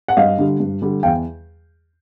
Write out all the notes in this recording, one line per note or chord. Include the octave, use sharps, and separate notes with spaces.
F#5
G2 D#5 F5
D3 G3
G2
D3 G3
E2 F5 G5